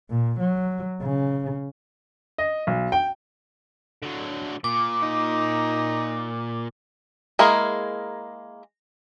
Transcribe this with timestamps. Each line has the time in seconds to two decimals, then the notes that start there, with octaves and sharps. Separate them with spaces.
0.10 A#2
0.39 F#3
1.02 C#3
2.38 D#5
2.67 B1
2.92 G5
4.03 D3 F#3
4.64 A#2 D6
5.03 D#4
7.39 G#3 A#3 E4 G#4 A#4